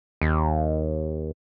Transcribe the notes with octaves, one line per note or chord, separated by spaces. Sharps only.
D#2